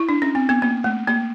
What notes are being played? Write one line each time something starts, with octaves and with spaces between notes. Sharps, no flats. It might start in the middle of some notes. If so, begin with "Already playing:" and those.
Already playing: E4
D4
C#4
C4
B3
A#3
A3
A#3